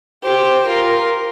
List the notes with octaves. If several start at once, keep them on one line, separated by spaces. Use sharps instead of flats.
G4 C5
F4 A#4